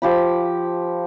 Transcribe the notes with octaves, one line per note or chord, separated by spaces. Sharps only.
F3 G4 B5